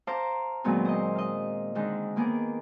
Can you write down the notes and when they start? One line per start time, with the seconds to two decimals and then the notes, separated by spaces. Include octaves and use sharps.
0.07 C5 F5 A5 A#5 D6
0.64 A#2 D#3 F#3 G#3 B3 C4
0.85 C5 D#5
1.15 D#5 F5
1.75 D3 D#3 G#3 D4 D#4
2.16 D#3 A#3 B3 G#4 D6